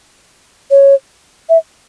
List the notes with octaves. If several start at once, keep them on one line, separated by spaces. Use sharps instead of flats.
C#5
E5